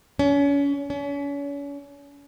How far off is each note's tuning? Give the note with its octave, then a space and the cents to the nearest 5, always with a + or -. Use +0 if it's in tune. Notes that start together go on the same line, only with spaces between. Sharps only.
C#4 +35
C#4 +40